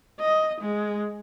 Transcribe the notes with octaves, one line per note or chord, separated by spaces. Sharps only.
D#5
G#3